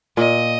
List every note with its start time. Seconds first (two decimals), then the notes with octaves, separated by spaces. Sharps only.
0.17 A#2 D#5